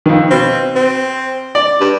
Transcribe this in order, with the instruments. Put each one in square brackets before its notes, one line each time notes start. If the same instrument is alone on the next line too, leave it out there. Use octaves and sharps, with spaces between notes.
[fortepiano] F2 D#3
[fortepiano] B2 [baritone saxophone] C4
[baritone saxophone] C4
[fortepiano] D5
[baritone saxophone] G2